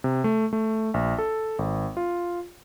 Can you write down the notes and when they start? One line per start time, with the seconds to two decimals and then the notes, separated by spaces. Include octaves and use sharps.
0.04 C3
0.24 A3
0.53 A3
0.94 A#1
1.18 A4
1.59 G#1
1.97 F4